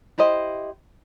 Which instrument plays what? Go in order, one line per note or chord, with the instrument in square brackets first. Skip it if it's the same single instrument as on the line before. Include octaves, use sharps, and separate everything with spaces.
[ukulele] E4 G4 C5 D#5